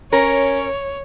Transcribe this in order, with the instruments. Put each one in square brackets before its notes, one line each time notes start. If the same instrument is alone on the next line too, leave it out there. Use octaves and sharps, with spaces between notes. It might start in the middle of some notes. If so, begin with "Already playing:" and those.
[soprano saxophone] C#4 [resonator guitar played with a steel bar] A#4 [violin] C#5